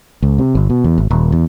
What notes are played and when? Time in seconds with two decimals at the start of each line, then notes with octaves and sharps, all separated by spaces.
0.23 C#2
0.38 C3
0.55 G1
0.70 B2
0.84 E2
0.98 G#1
1.11 D#1
1.32 E2